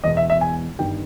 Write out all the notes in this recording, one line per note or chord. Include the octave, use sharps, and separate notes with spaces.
E1 E2 B2 D#5
E5
E5
G#5
G1 G2 D#3 G3 G5